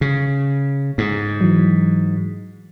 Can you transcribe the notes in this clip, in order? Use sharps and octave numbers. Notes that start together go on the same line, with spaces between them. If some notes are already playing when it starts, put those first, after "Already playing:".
C#3
G#2
E3 F#3